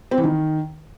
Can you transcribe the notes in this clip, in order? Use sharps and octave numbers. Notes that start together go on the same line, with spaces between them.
C4
E3
D#3